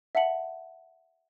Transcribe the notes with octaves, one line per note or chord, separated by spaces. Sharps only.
E5 F#5 A5 C#7 F#7